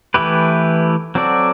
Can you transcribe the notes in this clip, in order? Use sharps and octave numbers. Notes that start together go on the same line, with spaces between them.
E3 A3 E4 G4 B4
F#3 C4 F#4 A4 D5